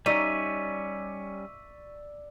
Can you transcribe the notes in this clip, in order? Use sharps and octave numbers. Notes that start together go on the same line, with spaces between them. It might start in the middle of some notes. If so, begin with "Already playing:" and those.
G3 C#4 D#4 D5 E5 C#6 B6 D#7